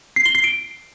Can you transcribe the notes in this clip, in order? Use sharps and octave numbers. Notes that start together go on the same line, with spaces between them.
C7
G7
C7
D7